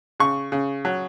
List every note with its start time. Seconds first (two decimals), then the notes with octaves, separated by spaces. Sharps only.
0.20 C#3 C#6
0.52 C#3
0.85 F#3